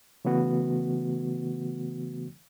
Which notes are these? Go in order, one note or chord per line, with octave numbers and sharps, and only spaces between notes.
C#3 E3 A3 B3 F#4